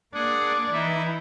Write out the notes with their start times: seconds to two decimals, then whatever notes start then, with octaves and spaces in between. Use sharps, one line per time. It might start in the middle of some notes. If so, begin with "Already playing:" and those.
0.14 A#3 D4 G#4 D5 F#5
0.73 E3 D#4 E4 E5